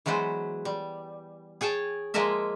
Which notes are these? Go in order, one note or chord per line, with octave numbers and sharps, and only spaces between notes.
E3 F#3 G#3 B3 C5
G3
G#4 C#5 G5 A5
F3 G#3 A#3 A#4 D#5 E5